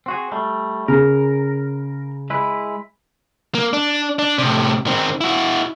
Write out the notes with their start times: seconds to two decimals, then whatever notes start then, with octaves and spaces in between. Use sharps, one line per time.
0.06 C4 F#4 G#4
0.31 G3 A3
0.88 C#3 A#4
2.30 G#3 E4 B4
3.55 A#3
3.73 D4
4.19 D4
4.39 A2 C3
4.87 D#3 C4
5.21 E4 F#4